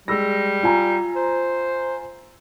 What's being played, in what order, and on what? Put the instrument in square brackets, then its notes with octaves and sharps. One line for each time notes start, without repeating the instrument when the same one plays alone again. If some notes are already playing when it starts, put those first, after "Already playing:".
[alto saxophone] G3 [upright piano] G#3 E6 A#6
[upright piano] F4 G#5 A#5
[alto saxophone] C5